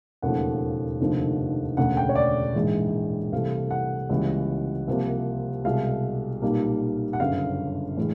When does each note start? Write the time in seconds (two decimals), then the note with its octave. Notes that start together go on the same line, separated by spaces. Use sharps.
0.22 E1 D#2 C#3 F3 A3 F#5
1.00 F1 D#2 D3 F3
1.77 E1 D2 C#3 F#5
1.97 G5
2.09 C#5
2.16 D5
2.55 A#1 G#2 E3 G#3
3.32 C2 C3 E3 A3 F5
3.71 F#5
4.09 C#2 C#3 E3 G3 A#3
4.88 C2 C3 F3 A#3
5.64 C2 B2 G#3 F5
6.42 B1 A#2 G3 A#3
7.13 F#5
7.20 G1 F#2 C#3 F5
7.97 A2 E3 G#3